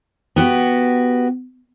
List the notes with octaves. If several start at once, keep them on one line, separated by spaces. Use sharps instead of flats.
B3 F#4 G4